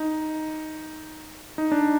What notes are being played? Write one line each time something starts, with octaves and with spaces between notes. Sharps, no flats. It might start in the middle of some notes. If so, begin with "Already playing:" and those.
Already playing: D#4
D#4
D4